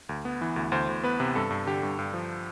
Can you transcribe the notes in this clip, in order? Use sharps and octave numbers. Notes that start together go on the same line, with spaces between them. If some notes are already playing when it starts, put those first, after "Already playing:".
D2
B3
E3
D2
D2 C5
D2
B3 B4
C3
G2 A4
G2
D3 G4
G2
G2
F3